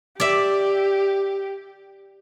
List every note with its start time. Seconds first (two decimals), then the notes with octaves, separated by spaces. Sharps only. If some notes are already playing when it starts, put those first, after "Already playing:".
0.20 G4 D5 E5